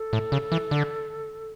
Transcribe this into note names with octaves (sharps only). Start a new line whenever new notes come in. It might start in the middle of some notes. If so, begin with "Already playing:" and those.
Already playing: A4
A2
C#3
E3
D3